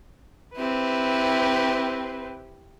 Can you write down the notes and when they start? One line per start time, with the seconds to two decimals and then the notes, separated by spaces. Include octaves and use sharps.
0.56 C4 E4 G4 B4